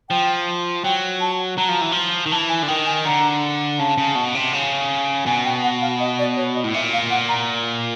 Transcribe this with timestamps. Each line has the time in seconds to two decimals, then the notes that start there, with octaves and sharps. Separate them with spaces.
0.09 F3 G5
0.84 F#3 G5
1.21 A5
1.58 F#3 A#5
1.69 F3
1.81 E3
1.92 F3
2.26 D#3
2.32 E3 A5
2.49 G#5
2.62 D3
2.68 D#3 G5
2.86 G#5
3.05 D3 A#5
3.79 C#3 A5
3.98 C#3
4.15 B2
4.35 C3
4.53 C#3
5.26 B2 G#5
5.45 G5
5.64 F#5
5.81 F5
6.00 D#5
6.19 D5
6.37 C#5
6.55 D#5
6.64 A2
6.74 A#2 E5
6.93 F5
7.10 F#5
7.29 A#5